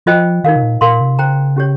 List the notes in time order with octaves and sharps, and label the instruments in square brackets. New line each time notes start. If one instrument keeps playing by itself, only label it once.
[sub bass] F3 [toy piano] F4 C5 D#5 G5
[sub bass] D#3 [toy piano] D#4 A#4 F5
[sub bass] C3
A#2
[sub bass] A#2 [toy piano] A#4 F5 C6
[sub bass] C3
[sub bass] C#3 [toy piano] C5 G5 A#5
[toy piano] C#4 G4 C#5